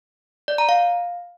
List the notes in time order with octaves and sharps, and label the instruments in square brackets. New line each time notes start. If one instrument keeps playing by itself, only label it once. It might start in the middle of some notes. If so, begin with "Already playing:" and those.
[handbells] D5
A#5
F5